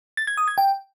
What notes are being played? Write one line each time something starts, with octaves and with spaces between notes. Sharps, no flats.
A6
G#6
D#6
G#6
G5